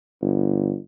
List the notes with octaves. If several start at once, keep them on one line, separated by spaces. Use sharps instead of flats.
G1